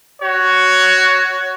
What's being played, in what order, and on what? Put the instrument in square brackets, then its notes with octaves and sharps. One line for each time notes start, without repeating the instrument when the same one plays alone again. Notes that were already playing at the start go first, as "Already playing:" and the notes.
[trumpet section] F#4 C#5